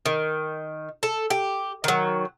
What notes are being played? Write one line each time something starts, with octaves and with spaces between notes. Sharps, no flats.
D#3
A4
G4
D#3 F#3